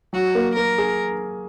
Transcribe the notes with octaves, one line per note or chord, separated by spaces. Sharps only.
F#3 F#4
A#3
A#3 A#4
G#4